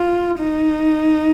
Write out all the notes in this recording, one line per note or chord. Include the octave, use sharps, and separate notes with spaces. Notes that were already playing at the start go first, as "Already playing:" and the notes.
Already playing: F4
D#4